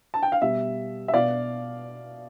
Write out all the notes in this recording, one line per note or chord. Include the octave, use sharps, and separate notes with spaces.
A5
G5
F5
B2 G3 E5
E5
B2 D5 F5